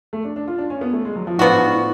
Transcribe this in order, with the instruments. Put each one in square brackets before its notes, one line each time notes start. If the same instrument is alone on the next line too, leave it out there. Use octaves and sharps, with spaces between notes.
[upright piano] A3
D4
D4
F4
D4
C#4
B3
A3
G#3
F#3
F3
[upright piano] A2 [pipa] F3 B3 D4 F#4
[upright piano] G#2
G#2
A2